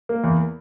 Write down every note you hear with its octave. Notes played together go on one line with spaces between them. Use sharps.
A#3
E2